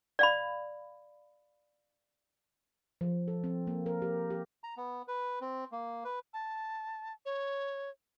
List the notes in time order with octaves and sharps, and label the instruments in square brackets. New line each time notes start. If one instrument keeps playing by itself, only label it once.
[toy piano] D5 F5 B5
[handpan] F3
A4
C4
A#3
A#4
G4
G4
[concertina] A#5
B3
B4
C4
A#3
B4
[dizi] A5
C#5